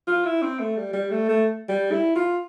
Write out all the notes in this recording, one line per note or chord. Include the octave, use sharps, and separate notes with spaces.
F4
E4
C4
A3
G3
G3
A3
A3
G3
E4
F4